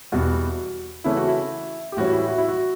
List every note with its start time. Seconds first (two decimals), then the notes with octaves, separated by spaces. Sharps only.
0.12 E2 B2 G3 B3 F#4
1.04 C#3 E3 A3 C#4 E4
1.17 F#4
1.28 E4
1.92 G4
1.97 A2 E3 G3 C#4 F#4
2.13 E4
2.27 F#4
2.38 E4
2.48 F#4